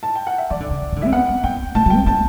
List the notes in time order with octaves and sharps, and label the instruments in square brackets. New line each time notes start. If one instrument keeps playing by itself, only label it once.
[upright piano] A5
G5
F#5
E5
[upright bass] E3 [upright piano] D5
[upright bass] D3
D3
E3
E3
D3
[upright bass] C4 [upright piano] E5
[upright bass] B3 [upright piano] F#5
[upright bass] B3
[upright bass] B3 [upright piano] G5
[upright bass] A3 [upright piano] A5
[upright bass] F#3 [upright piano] G5
[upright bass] C4
[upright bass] B3 [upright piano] A5